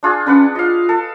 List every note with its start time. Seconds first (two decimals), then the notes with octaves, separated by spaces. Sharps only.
0.03 D4 F4 G#4
0.26 C#4 D4 B4 F#5
0.55 F4 D#5 F5
0.89 A4